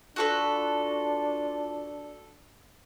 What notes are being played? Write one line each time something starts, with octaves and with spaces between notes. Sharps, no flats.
D4 F4 F#4 A4 B4